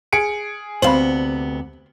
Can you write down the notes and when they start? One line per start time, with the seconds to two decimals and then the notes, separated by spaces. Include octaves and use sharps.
0.13 G#4 C#7 D7
0.82 D2 C3 B3 C5 F5 B5 F#7